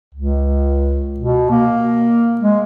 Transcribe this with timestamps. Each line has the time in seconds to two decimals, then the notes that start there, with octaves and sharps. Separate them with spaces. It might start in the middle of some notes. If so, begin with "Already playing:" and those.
0.14 C#2
1.20 B2
1.51 A#3
2.41 G#3